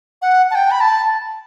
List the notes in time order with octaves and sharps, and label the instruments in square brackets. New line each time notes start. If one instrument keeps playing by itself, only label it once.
[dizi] F#5
A5
G5
B5
A5